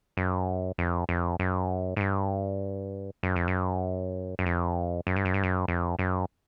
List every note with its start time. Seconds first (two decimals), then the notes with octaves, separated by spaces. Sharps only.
0.17 F#2
0.78 F2
1.09 F2
1.40 F#2
1.96 G#2
2.01 G2
3.23 F#2
3.36 F2
3.48 F#2
4.39 F#2
4.46 F2
5.07 F#2
5.16 G2
5.25 F#2
5.34 G2
5.43 F#2
5.68 F2
5.99 F#2